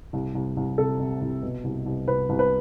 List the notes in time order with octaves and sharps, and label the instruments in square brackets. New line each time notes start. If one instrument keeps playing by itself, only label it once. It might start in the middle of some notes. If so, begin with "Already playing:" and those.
[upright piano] C2
C2
C2
C3 A4
C3
C2
B2
C2
C2
C2 B4
C2
B4